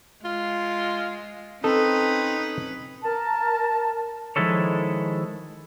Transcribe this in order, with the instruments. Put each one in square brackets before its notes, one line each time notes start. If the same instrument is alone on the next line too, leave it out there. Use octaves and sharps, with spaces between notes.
[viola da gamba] G#3 [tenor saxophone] F4
[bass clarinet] C4 [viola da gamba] C#4 B4 [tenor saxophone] D#4 [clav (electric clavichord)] A4
[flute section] A#4 A5
[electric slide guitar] D#3 F3 G#3 E4 A4 C#5